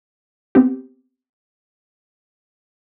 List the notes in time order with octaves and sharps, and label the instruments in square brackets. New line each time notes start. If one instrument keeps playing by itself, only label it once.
[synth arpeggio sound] B3 C4 G4